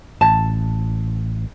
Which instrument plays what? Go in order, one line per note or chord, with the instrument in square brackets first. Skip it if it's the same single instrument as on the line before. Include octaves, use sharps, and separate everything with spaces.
[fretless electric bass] A1 [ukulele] A5